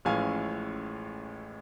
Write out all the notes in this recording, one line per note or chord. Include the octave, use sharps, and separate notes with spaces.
A1 A2 F3 G#3 C#4 F5 G#5